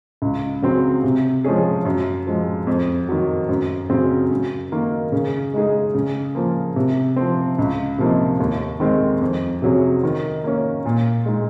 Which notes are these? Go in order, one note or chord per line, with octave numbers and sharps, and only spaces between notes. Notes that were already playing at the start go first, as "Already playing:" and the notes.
C#2
C#3 F#3 C4
C3
F3 G#3 C#4 G#4
F#2
F3 G#3
F2
D#3 F#3
F#2
C#3 F#3 C4
F#2
D#3 A#3
C#3
G#3 D#4 G#4
C#3
F3 A#3
C3
F3 C4
C#2
C3 F3 A#3 D#4
D#2
D#3 G#3 C4
F2
C3 F#3 C#4 G#4
D#3
A#3 C#4
A#2
G#3 D#4